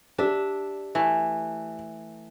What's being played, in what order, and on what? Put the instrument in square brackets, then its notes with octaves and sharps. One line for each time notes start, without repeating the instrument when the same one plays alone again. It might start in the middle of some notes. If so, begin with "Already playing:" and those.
[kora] D4 E5 [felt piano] G4
[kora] E3 A3